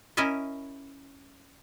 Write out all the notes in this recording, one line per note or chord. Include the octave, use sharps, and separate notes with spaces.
C#4 E4 A#4 D#5 E5